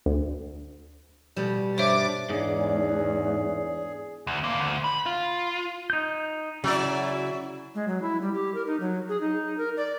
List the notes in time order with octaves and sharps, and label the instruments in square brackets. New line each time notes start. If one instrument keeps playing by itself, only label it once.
[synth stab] D2
[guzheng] B2 G3
[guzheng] G2 [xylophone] C5 C#5 E5 [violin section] D6 A6
[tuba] E2 [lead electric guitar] G#2 [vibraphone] D4 C#5 D5 [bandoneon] G#4
[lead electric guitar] D2
D2 A#3
D2
B5
F4
[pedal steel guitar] D#4 G6
[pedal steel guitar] C#3 E4 [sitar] F#3 D5
[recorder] G#3
F#3
E4
G3
G4
A#4
D#4
F#3
G#4
D#4
A#4
D5